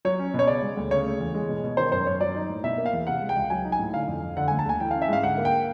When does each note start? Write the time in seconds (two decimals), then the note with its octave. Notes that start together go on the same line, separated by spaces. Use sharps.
0.05 F#3 C#5
0.19 C#4
0.34 B2
0.39 C#5
0.47 C#3 D5
0.62 G#3
0.77 D2
0.91 C#3 C#5
1.06 A3
1.21 E2
1.34 G#3
1.49 B2
1.63 B2
1.77 D#3 C5
1.92 F#2 C5
2.06 F#2 C#5
2.21 F#3 D5
2.36 D#4
2.50 A2
2.64 B2 E5
2.78 A#3
2.86 F5
2.93 E2
3.07 C3 F#5
3.21 G#3
3.29 G5
3.36 C#2
3.50 F#3 G#5
3.65 D#4
3.72 G#5
3.79 A2
3.94 D3 F5
4.08 F2
4.23 F2
4.37 D3 F#5
4.48 D2 G#5
4.59 A5
4.66 D2 G#5
4.80 E3 G5
4.91 C#4 F5
5.02 E5
5.08 G#2 F5
5.23 D3 F#5
5.38 A#3
5.45 G5